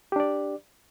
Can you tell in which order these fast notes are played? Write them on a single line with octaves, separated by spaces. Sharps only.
G4 D4 D5